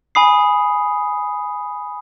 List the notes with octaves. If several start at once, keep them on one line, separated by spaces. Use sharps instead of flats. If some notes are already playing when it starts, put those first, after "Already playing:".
G#5 B5 D#6 C7